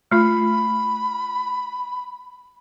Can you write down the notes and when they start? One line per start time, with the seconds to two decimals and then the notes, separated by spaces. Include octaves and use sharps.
0.11 A3 F4 B5